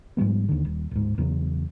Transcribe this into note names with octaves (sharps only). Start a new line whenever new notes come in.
G#2 F3 G3 B3
D#2 D3
D#1
D1 G#2
E2 C#3 F#3